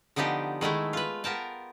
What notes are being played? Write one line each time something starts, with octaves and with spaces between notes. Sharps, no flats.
D3 F3 B3 D#4 G4
D#3 G#3 A3 E4
F4 B4
B3 A#4 G5 A5